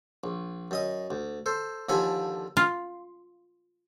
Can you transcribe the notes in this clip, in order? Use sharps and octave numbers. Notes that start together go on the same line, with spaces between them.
A#1
F#2 D#5 D#6
D2
A4 C5
D#2 D3 F3 A4 G#5 B5
F4